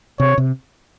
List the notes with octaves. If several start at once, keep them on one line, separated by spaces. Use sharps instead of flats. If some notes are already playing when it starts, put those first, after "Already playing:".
C3 C#5
C3